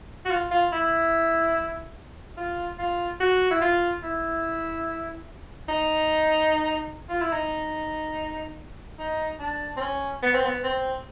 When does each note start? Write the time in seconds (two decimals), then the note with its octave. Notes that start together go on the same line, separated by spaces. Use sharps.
0.25 F#4
0.31 F4
0.51 F4
0.72 E4
2.37 F4
2.79 F4
3.20 F#4
3.51 E4
3.61 F4
4.03 E4
5.69 D#4
7.09 F4
7.21 E4
7.33 D#4
8.99 D#4
9.40 D4
9.77 C4
9.81 C#4
10.23 B3
10.35 C4
10.46 B3
10.64 C4